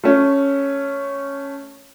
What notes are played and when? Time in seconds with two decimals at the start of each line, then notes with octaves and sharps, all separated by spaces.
0.04 A3 C#4